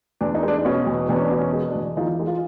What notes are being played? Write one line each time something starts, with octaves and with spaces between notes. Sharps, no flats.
E2 D4
D#4
G#3 D4
B2 C#4
E2
E2 D4
C#4
D4
B2
C#4
G#3
D4
E2
E3 D#4 F4
G#3
D#4 F4